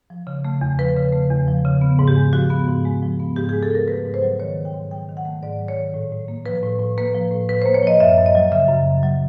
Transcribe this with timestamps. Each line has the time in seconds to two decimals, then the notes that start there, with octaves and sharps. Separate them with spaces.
0.10 F3
0.27 C#3
0.45 A3
0.61 E2
0.79 F3 B4
0.96 C#3
1.13 A3
1.30 E2
1.48 F3
1.65 C#3
1.81 B3
1.99 G#2
2.08 G4
2.16 G#3
2.33 F3 F#4
2.50 B3
2.68 G#2
2.85 G#3
3.02 F3
3.19 B3
3.36 G#2 G4
3.49 G#4
3.53 G#3
3.63 A4
3.71 F3 A#4
3.88 A3 B4
4.05 G#2
4.14 C5
4.22 F#3
4.40 D#3 C#5
4.57 A3
4.65 G5
4.74 G#2
4.91 F#3 G5
5.09 D#3
5.17 F#5
5.25 A3
5.42 G#2 D5
5.59 F#3
5.68 C#5
5.77 D#3
5.94 A2
6.12 A2
6.28 A#3
6.46 F3 B4
6.63 A2
6.80 A2
6.97 A#3 B4
7.15 F3
7.31 A2
7.49 A2 B4
7.62 C5
7.66 A#3
7.74 C#5
7.83 F3 D#5
8.00 F#2 E5
8.18 F#2
8.26 D#5
8.35 F#3
8.52 C#3 E5
8.69 F#2
8.86 F#2
9.03 F#3